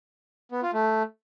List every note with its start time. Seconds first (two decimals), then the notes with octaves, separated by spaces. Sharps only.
0.52 B3
0.63 F4
0.73 A3